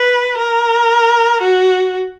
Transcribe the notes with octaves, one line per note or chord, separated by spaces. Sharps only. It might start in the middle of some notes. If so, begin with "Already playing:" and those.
Already playing: B4
A#4
F#4